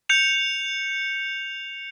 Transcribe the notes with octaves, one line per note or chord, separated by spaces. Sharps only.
G6 C#7 F7